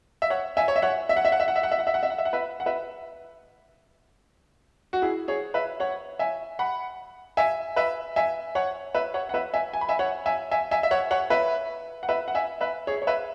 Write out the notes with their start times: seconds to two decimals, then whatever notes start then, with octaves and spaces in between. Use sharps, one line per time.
0.22 E5
0.30 C#5 F#5
0.57 E5 G#5
0.68 C#5
0.76 E5
0.82 C#5 F#5
1.09 E5
1.17 F#5
1.25 E5
1.32 F#5
1.40 E5
1.48 F#5
1.56 E5
1.63 F#5
1.71 E5
1.79 F#5
1.87 E5
1.94 F#5
2.03 E5
2.10 F#5
2.18 E5
2.25 F#5
2.33 B4 E5
2.60 F#5
2.66 B4 E5
4.93 F#4
5.02 E4 G#4
5.28 G#4 C#5
5.54 B4 E5
5.80 C#5 F#5
6.19 E5 G#5
6.59 F#5 B5
7.37 E5 G#5
7.76 B4 E5
8.16 E5 G#5
8.55 C#5 F#5
8.94 B4 E5
9.14 C#5 F#5
9.29 F#5
9.34 B4 E5
9.54 E5 G#5
9.73 G#5
9.81 B5
9.89 E5 G#5
9.99 C#5 F#5
10.26 E5 G#5
10.51 E5 G#5
10.71 E5 G#5
10.83 E5
10.91 C#5 F#5
11.11 C#5 F#5
11.30 B4 E5
12.03 F#5
12.09 B4 E5
12.28 F#5
12.35 E5 G#5
12.61 B4 E5
12.87 G#4 C#5
13.02 C#5
13.07 B4 E5